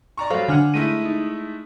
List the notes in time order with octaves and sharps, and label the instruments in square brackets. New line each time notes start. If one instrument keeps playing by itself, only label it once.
[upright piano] D5 A#5 C#6
[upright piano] F#3 G3 [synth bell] A4 C5 F5
[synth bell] D3 D4 F6 [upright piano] F#5 G#5
[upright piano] G#3 A3 E4 [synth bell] D#7
[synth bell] D#4